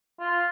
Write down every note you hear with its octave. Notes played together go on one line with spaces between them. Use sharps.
F4